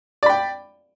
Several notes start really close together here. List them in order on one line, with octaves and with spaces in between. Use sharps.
D5 B5 G5